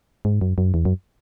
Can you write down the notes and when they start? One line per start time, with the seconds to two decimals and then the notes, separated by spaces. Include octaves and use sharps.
0.25 G#2
0.41 F#2
0.58 F#2
0.74 E2
0.85 F#2